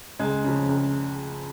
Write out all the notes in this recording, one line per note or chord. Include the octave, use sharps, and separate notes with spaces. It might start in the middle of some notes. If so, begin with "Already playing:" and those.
C#2 G#3
C#3 F3
C#2